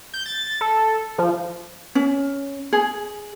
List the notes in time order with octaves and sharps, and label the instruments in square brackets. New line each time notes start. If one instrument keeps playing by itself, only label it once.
[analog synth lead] G6
A6
A4
F3
[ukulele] C#4
G#4